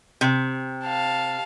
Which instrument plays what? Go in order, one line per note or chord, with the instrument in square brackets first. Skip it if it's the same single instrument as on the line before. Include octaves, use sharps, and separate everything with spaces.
[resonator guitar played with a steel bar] C3
[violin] F5 A5